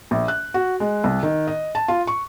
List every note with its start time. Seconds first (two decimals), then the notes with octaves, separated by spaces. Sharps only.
0.11 A#1
0.28 F#6
0.54 F#4
0.80 G#3
1.04 C2
1.23 D#3
1.47 D#5
1.75 A5
1.88 F4
2.07 C#6